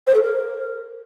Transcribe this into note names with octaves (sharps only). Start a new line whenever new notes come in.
C5
A4
A#4